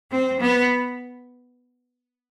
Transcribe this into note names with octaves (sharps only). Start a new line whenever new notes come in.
C4
B3